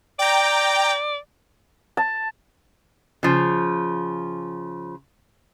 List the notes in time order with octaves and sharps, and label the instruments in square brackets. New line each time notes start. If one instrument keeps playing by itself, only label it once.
[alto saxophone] D5 [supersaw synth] G5 A#5
[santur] A5
[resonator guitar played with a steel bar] C#3 F3